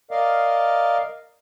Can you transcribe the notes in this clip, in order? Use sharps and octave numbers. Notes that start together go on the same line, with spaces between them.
A#4 D5 D#5 F5